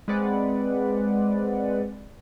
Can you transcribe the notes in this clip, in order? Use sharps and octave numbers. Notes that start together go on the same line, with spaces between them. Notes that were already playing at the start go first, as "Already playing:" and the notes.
G#3 C4 B4 D5 F#5